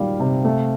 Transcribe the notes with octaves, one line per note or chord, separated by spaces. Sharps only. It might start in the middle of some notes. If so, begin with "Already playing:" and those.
Already playing: A#2 D#3 G3 F5
C3
A3